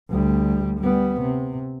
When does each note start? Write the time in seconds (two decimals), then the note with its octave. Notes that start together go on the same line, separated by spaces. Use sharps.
0.10 D2 G3
0.80 G3 B3
1.21 C3